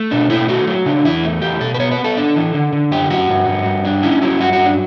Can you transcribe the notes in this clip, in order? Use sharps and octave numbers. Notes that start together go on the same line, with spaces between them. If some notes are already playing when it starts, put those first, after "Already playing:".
Already playing: A3
B2 D4
A3 E4
A3 F#4
F#3
C#3 D4
E2 E4
A3
E2 G4
B2 A4
B4
B3 C#5
B4
B3
A4
D4
E3
D3
D3
F#2 G4
F#2 F#4
G2
G2
G2
D4
C#4 E4
F#3 E4
G2 F#4
F#4
F#3
D4